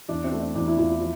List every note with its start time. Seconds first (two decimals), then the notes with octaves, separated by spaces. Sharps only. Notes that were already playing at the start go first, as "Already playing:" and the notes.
0.09 E2 D4
0.24 C4
0.32 A3
0.40 D4
0.55 E2 D4
0.66 E4
0.77 E2 F4
0.89 E4
1.00 F3